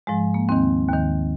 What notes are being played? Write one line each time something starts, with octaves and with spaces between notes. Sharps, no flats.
G#2 F3 G#3
A#3
D#2 D#3 C4
D#2 D#3